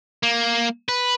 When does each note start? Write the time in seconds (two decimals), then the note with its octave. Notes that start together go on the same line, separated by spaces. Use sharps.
0.23 A#3
0.89 B4